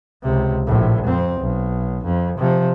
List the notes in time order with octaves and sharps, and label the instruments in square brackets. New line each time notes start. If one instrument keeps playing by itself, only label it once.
[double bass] C#2 C3
A#1 A2
F2 C4
B1
F2
C3 F3